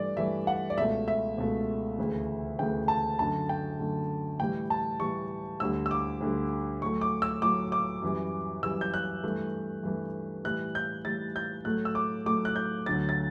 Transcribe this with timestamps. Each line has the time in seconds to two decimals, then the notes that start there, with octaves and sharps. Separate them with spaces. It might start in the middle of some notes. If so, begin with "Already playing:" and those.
Already playing: G2 E3 A3 D5
0.16 G2 E3 A3 E5
0.47 F#5
0.70 D5
0.77 C#2 B2 A3 E5
1.08 E5
1.38 C#2 B2 A3
1.98 D2 C#3 E3 A3
2.59 D2 C#3 E3 A3 G5
2.88 A5
3.19 F#2 D3 A3 A5
3.49 G5
3.79 F#2 D3 A3
4.40 A2 E3 G3 G5
4.70 A5
5.00 A2 E3 G3 C#6
5.60 D2 D3 G3 E6
5.86 E6
5.91 D6
6.21 D2 D3 G3
6.82 A2 F#3 A3 C#6
7.01 D6
7.22 E6
7.42 A2 F#3 A3 D6
7.72 D6
8.02 F#2 E3 G3
8.63 F#2 E3 G3 E6
8.81 G6
8.94 F#6
9.23 G2 E3 A3
9.83 G2 E3 A3
10.44 A2 E3 G3 F#6
10.75 G6
11.05 A2 E3 G3 A6
11.36 G6
11.65 A2 F#3 A3 F#6
11.85 E6
11.95 D6
12.26 A2 F#3 A3 D6
12.45 F#6
12.56 G6
12.86 D2 D3 F#3 A6
13.09 A6